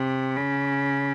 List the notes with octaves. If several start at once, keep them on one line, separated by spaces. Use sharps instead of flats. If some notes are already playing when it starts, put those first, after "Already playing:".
Already playing: C3
C#3